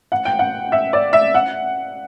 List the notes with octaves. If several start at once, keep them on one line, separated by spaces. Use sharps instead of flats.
F#5
G5
F#5
E5
D5
E5
F#5